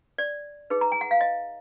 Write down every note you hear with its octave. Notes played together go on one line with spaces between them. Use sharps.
D5
D#4 G#4 B4
A#5
G#5
F#5
F5
D#5